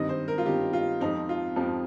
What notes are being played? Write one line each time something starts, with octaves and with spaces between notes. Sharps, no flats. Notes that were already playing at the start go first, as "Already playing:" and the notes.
Already playing: G2 D#3 C4 D#5
C5
A#4
F4
G2 D#3 C4 G4
F4
F2 F3 C4 D#4
F4
F2 F3 C4